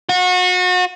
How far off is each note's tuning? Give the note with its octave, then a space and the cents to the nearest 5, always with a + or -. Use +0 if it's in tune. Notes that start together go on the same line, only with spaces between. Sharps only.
F#4 -30